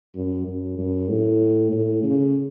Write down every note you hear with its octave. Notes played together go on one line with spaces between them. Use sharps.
F#2
F#2
F#2
A2
A2
C#3